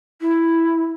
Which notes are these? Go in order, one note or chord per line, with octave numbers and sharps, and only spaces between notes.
E4